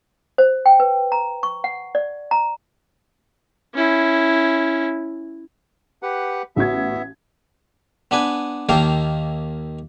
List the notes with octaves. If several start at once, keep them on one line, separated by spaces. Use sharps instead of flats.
C5
G5
B4
A#5
C#6
F#5
D5
A#5
C#4 E4
G4 B4 F#5
A1 B3 F#4 E5 G#6
B3 D4 B4 G#5
D#2 D#3 A#3 F5 G5 A5